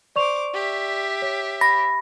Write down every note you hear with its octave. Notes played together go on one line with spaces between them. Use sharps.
C5 D5 C#6 D6 F7
G4 E5
C#5
B5 A#6